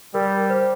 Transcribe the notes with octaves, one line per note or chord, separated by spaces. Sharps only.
G3 A#4
C5